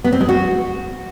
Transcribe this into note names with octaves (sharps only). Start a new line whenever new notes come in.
B3
C4
G#3
F#4